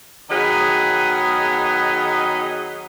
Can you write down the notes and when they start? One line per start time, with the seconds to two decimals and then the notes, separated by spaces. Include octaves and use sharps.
0.30 D#3 F#3 B3 G#4 D#5